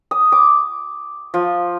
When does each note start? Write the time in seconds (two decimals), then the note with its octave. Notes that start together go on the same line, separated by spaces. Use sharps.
0.11 D#6
0.32 D6
1.34 F3